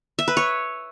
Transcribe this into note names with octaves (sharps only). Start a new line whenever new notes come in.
E5
B4
C#5